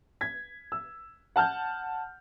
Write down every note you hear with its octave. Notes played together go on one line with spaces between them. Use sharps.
G#6 B6
E6
F#5 A5 F6 G6